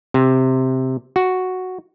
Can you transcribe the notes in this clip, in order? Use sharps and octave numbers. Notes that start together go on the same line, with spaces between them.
C3
F#4